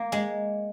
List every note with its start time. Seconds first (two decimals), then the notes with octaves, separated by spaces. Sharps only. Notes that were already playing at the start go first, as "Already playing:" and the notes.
Already playing: A#3
0.12 G#3